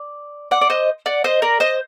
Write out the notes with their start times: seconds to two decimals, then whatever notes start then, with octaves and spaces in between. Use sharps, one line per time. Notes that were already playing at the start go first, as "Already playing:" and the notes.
Already playing: D5
0.51 D5 F#5
0.61 D5
0.70 C5 D#5
1.06 D5 F#5
1.24 C5 D#5
1.42 A#4 D5
1.60 C5 D#5